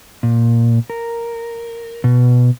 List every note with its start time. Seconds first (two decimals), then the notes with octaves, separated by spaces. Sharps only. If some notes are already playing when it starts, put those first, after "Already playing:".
0.23 A#2
0.90 A#4
2.04 B2